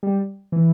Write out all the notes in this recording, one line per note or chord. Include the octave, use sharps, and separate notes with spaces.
G3
E3